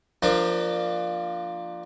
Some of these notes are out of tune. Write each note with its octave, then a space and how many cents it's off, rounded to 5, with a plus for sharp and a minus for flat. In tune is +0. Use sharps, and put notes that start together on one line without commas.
F3 +0 A#3 +0 D4 +25